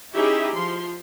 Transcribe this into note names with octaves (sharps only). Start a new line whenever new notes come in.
C#4 D#4 E4 G4 G#4 E5
F3 C6